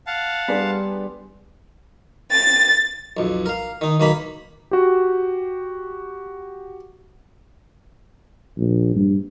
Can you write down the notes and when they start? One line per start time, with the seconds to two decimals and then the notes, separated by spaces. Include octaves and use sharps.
0.07 F5 F#5 A5
0.48 G3 B3 D4 G4 G#4 C6
2.31 A6
3.17 B1 F2
3.46 A#4 F5
3.81 D#3 D#4
4.00 B1 D#3 A#3 A#5 B5
4.71 F#4 G4
8.57 A#1
8.95 G2